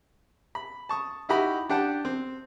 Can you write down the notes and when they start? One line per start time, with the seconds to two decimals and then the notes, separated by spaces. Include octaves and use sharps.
0.55 B5
0.89 A5 C#6 D#6
1.29 D#4 E4 F#4 G4 D#5 B5
1.69 D4 G4 F#5 G5 A5
2.05 C4